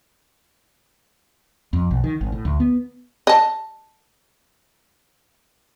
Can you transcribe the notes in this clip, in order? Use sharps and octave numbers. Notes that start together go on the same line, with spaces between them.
F2
B1
D#3
G#1
A2
D2
B3
D#5 A5